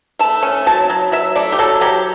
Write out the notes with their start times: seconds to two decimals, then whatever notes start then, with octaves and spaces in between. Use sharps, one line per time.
0.19 A3 A5
0.43 C#4
0.66 F#3 A5
0.90 F#3
1.12 F#3 E5
1.36 A3 D5
1.52 G4
1.59 F#3 A4
1.81 F#3 G4